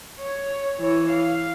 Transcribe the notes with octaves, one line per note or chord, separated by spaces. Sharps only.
C#5
E3 C#5
F5